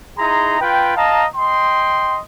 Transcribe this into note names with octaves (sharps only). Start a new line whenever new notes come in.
D#4 E4 G#4 A#5 C6
F4 B4 G5
D#5 F5 A5 A#5
D#5 G5 C6